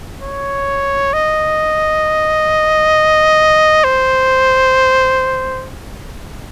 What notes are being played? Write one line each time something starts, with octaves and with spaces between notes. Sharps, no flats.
C#5
D#5
C5